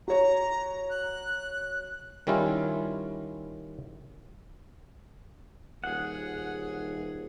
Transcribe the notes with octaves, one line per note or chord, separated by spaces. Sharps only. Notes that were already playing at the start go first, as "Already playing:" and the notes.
F#4 C#5 A#5
F#6
D#3 G3 C#4 E4 F4
D#1 G#4 F#5